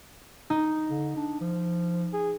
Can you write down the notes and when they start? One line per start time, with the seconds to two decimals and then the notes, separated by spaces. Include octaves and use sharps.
0.50 D#4
0.90 D3
1.16 D4
1.41 F3
2.13 G#4